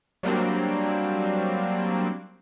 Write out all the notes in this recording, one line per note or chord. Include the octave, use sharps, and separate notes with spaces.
F#3 G3 A#3 C4 D4